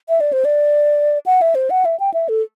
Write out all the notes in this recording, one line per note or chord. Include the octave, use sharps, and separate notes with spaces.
E5
D5
C5
D5
F#5
E5
C5
F#5
E5
G5
E5
A4